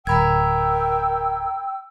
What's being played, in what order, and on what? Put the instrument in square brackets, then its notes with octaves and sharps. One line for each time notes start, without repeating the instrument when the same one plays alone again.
[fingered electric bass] D1 [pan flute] A#4 [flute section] G5 E6 [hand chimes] A#5 B5 G#6